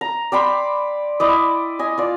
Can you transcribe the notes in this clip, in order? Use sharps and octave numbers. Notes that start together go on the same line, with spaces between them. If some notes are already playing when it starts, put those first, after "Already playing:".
A#5
D5 G5 B5 C6
E4 D5 D#5
D#5 G#5
F4 D5